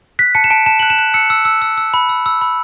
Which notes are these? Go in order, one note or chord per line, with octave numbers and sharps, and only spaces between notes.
F#6 B6
A5 C#7
E7
A5 D7
A5 E7
F#6 F#7
E7
F#6
E6 C#7
E6
E6
E6
E6
B5
E6
E6
B5